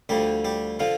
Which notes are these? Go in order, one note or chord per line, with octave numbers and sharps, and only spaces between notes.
D2 D3 F3 G3 G4
G3 G4
D3 F3 F4